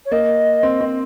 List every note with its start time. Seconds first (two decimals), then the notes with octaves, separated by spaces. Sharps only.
0.05 C#5
0.11 A#3 D#5
0.63 C4
0.81 C4